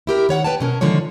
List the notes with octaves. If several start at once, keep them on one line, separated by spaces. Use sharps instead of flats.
E4 G4 A#4
D#3 C#5 F#5
B4 G5 A5
B2 C#4 A#4
D3 D#3 F3 G#3 C#5